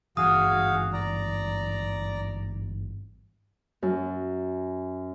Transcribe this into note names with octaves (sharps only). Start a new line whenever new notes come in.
G#1 G2 E3 F#4 G#4 F5 D#6
D5 A#5
F#2